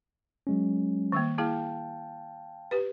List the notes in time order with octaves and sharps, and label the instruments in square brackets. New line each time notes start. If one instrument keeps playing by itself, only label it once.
[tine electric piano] F#3 G#3 C#4
[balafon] D#3 G3 A#3
[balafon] A#3 E4 G#4 [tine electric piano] F5 G5 A5
[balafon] G4 B4